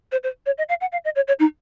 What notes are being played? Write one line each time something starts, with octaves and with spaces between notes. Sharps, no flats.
C5
C5
C#5
D#5
F5
F#5
F5
D#5
C#5
C#5
D#4